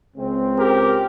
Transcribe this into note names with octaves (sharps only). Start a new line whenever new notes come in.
C#2 C#3 G#3 C4
G4 A#4